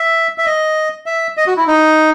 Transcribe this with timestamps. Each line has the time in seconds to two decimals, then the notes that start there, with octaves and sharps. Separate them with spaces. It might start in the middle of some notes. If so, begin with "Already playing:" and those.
Already playing: E5
0.38 E5
0.46 D#5
1.06 E5
1.37 D#5
1.47 F#4
1.57 E4
1.67 D#4